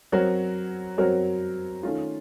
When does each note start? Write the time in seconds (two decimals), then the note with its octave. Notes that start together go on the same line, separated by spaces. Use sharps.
0.12 F#3 C4 F#4 A#4 C#5
0.98 F#3 C4 F#4 A#4 C#5
1.83 D#3 A3 C#4 F4